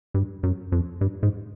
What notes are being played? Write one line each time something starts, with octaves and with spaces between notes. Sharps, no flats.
G2
F#2
F2
G2
G#2